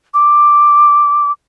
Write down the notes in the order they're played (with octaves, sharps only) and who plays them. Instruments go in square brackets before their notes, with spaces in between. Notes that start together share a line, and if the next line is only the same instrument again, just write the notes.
[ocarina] D6